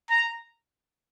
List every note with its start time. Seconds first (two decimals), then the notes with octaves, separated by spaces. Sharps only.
0.10 A#5